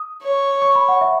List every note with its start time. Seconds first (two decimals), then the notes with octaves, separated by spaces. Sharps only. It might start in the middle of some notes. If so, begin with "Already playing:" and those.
Already playing: D#6
0.23 C#5
0.62 C#6
0.75 B5
0.88 F#5
1.01 E5